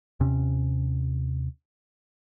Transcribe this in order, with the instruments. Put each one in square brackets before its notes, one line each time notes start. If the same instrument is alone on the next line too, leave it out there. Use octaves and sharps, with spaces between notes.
[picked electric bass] D#2 C3 C#4